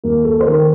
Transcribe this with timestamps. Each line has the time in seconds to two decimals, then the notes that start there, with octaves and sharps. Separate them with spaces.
0.04 D#2 A#4
0.25 A4
0.41 C5
0.47 D#3 A#4